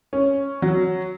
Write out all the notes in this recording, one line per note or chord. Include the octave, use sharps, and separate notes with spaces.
C#4
F#3